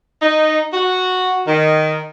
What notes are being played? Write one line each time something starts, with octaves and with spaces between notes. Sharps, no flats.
D#4
F#4
D#3